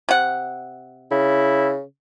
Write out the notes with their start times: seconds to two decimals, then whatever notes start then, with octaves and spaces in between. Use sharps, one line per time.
0.09 C3 F#5
1.11 C#3 E4